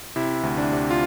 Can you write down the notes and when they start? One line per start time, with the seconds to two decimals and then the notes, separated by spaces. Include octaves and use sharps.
0.16 C3 E4
0.43 D2
0.58 D4
0.72 C3
0.91 F4